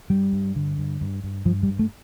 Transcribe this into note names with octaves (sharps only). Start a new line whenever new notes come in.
G2 G3
G2
D3
G2
G2
G2
G2 F3
G3
G2
A3